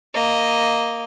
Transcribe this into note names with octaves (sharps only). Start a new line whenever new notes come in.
A#3 D#5